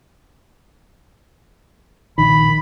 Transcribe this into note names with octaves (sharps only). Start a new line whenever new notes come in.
A#1 D#3 B5